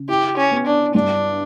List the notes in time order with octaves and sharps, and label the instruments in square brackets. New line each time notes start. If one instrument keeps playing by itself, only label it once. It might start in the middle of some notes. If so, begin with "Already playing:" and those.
Already playing: [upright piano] C#3
[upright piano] E4 [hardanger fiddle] G4
[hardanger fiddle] C#4
[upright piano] B3
[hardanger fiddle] D4
[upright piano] G2 [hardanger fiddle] D4